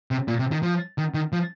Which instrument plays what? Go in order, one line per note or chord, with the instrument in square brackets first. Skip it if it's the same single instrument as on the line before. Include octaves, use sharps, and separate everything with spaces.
[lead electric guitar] C3
A#2
C3
D#3
F3
D#3
D#3
F3